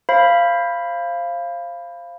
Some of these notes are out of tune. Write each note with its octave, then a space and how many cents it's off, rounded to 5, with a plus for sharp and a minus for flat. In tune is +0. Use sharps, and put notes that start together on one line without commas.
C5 +25 F5 -15 B5 +0